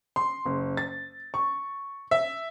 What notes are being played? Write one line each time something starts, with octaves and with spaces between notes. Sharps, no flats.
C6
F#1
A6
C#6
E5